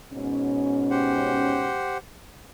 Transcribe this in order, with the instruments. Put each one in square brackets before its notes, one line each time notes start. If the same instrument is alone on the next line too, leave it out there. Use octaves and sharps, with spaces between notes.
[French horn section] G#2 B2 C#4
[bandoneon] G4 C5 F#5